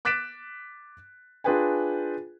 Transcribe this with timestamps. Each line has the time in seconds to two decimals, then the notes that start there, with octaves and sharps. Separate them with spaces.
0.05 D6 F#6 A6 B6 D7 E7
1.44 D4 F4 G#4 B4 G5 G#5